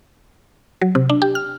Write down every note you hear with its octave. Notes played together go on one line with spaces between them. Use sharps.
F#3
C3
D4
G4
F6